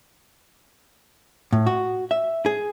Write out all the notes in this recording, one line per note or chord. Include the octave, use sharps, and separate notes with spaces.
A2
F#4
E5
G#4